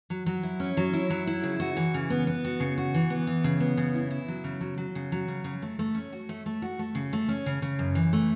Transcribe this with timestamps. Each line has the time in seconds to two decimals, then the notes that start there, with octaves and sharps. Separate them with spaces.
0.10 F#3
0.26 F#3
0.43 E4
0.60 C#4
0.77 F#3
0.93 E4
1.10 F#3
1.27 E4
1.43 C#3
1.60 F#4
1.77 E3
1.94 C#3
2.10 B3
2.27 B3
2.45 F#4
2.60 C#3
2.78 F#4
2.94 E3
3.10 B3
3.27 E3
3.44 C#3
3.60 B3
3.77 C#3
3.94 E4
4.11 E4
4.28 F#3
4.44 C#3
4.61 F#3
4.78 F#3
4.95 C#3
5.12 F#3
5.28 C#3
5.44 C#3
5.62 A3
5.79 A3
5.95 C#4
6.12 F#4
6.29 A3
6.46 A3
6.62 F#4
6.79 A3
6.95 C#3
7.13 A3
7.28 C#4
7.46 C#3
7.62 C#3
7.79 F#2
7.95 E3
8.13 A3